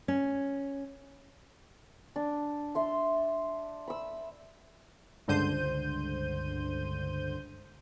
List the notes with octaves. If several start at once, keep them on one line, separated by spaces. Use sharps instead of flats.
C#4
D4
E5 C6
B5 E6
C#2 G2 D3 C5 G6 D#7